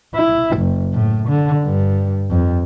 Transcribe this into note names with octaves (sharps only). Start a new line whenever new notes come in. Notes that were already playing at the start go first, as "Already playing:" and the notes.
E4
F#1
A2
D3
G2
F2